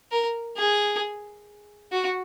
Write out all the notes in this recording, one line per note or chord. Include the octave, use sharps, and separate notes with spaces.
A#4
G#4
F#4